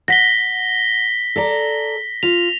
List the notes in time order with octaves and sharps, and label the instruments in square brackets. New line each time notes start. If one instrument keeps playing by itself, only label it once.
[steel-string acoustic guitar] F#5 [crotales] A#6 B6 G7
[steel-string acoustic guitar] A4 D5 A#5
[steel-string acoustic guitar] F4 [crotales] F7